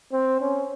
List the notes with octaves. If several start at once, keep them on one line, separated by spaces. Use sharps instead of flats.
C4
C#4